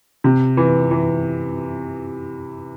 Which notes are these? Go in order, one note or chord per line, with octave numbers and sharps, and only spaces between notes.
C3
E3
E3